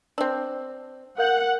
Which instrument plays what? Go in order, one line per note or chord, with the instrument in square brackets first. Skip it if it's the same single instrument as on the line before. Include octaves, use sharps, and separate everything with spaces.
[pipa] C4 D4 [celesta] E6
[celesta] A#4 F5 G6 [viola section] F#5